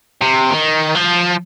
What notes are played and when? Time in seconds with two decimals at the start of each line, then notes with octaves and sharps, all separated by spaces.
0.21 C3
0.51 D#3
0.95 F3